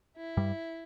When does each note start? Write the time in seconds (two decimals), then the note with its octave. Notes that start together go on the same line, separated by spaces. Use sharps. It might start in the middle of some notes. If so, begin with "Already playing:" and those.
0.17 E4
0.37 G2 G3